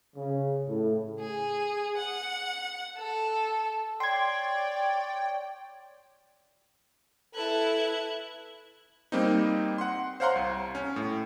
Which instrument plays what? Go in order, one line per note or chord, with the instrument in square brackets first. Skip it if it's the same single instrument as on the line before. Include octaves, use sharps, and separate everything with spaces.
[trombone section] C#3
A2
[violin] G#4
F#5
A4
[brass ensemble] C#5 D5 [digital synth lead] G5 [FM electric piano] C6 G#6
[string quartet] E4 B4 [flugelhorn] A4 [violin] F#6 G#6
[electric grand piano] G3 A#3 C4 D#4
F#5 C6
C5 C#5 F5 F#5 A#5 C6
C2
C#4
A2